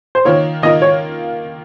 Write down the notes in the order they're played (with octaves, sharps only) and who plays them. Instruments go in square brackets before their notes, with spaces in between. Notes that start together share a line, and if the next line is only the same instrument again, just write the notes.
[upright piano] C5
[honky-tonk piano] D#3 A#3 F4 A#4 [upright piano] C#5
[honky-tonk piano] D#3 A#3 F4 A#4 [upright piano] D#5
[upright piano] C#5